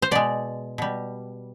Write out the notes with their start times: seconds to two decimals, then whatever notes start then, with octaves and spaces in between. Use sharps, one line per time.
0.02 C5
0.11 B2 G#3 D5
0.78 B2 G3